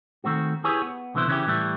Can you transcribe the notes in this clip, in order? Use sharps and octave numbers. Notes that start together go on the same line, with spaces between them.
D#3 A3 C4 F#4
E4 G4 G#4 B4 C#5
B3
C2 B2 D3 E3 E4 C5
C#3 E3 C#4 D#4 E4 G4
A2 E3 G3 E4